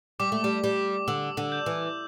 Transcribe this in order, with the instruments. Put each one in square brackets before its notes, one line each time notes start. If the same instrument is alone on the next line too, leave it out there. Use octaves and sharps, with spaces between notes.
[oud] G3 [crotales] D6
[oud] A3
G3
G3
[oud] D3 [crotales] E6
[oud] D3
[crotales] G6
[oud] E3